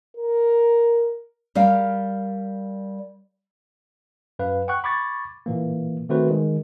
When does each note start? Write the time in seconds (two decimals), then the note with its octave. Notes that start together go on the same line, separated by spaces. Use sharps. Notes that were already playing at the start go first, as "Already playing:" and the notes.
0.17 A#4
1.55 G3 A#4 D5 F5
4.39 F#2 B4 F5
4.68 F#5 G5 C#6 F#6
4.84 B5 C#6 D6 G#6 A6
5.46 A#2 E3 A#3
6.09 D#3 A3 C4 F#4 B4 C5
6.30 D#3 G#3